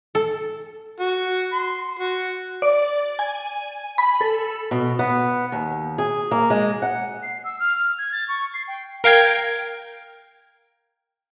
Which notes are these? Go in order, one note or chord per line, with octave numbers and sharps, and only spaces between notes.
A4
F#4
C6
F#4
D5
G#5
B5
A4
B2
B3
D#2
G#4
A#3
G#3
F#5
C7
E6
F6
F6
G#6
A6
C#6
C7
G5
A#4 F5 G5 G#6